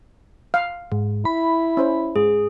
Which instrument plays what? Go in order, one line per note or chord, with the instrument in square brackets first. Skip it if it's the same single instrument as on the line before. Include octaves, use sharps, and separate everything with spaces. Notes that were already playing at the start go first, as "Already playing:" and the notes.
[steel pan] F5
[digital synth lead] G#2
[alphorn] E4 [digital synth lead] B5
[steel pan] C#4 C5
[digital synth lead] G#2 [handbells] G#4